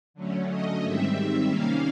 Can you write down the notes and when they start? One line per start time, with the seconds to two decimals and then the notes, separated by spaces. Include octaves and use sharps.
0.14 D3 F#3 A3 C#4
0.48 D#5
0.81 G#2 D#3 G3 C4 E5
1.14 E5
1.48 C3 D#3 G3 A#3 C#4 F5